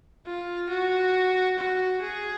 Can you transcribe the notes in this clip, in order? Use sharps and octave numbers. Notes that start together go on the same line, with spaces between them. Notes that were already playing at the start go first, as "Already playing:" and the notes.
F4
F#4
F#4
G#4